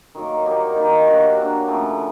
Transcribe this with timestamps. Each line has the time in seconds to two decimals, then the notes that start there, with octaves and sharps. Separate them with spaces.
0.15 D#3 F#3 A#3
0.45 D#3 G3 A#3 D#4
0.76 D#3 G3 A#3 D#4
1.07 F#3 A#3 D4 F#4
1.37 F#3 A#3 D4 F#4
1.68 C#3 F3 A3